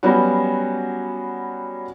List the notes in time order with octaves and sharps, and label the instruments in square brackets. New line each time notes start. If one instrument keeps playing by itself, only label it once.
[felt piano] F#3 G3 B3 C#4 F#4